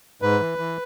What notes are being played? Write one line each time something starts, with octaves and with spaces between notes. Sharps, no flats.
G#2 B4
E3
E3